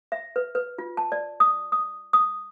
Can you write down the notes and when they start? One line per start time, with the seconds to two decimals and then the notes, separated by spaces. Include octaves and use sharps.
0.12 E5
0.36 B4
0.55 B4
0.78 F4
0.97 A5
1.12 D5
1.40 D#6
1.72 D#6
2.13 D#6